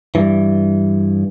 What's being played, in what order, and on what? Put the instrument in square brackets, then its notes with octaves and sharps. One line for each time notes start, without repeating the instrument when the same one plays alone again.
[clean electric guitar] G2 E3